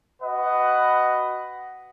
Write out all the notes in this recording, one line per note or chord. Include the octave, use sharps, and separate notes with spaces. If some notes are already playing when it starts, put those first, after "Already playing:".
F#4 B4 D#5 F#5